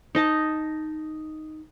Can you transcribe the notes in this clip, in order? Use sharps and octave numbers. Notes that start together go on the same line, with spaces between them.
D#4 D#5 A5